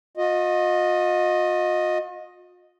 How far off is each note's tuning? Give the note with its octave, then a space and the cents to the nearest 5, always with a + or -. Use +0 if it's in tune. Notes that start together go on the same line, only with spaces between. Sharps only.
F4 +45 D#5 +0